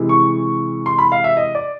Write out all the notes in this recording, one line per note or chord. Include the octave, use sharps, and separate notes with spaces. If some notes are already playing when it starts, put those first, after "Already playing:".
Already playing: C3 E3 G#3
C#6
C6
B5
F5
E5
D#5
D5